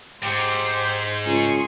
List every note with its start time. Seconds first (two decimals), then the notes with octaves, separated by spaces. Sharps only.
0.23 G#2 G4 C5
1.26 C#2 G#4 C6 C#6